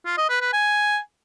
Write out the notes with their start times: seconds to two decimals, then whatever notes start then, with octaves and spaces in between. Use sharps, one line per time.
0.06 F4
0.18 D#5
0.29 B4
0.41 B4
0.53 G#5